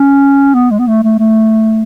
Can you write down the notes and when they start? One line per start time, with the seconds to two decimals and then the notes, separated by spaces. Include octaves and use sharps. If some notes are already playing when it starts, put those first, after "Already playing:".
Already playing: C#4
0.55 B3
0.71 G#3
0.79 B3
0.87 A3
1.03 A3
1.19 A3